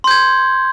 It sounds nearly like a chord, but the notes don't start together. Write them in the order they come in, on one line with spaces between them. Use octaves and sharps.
C6 G6 G#6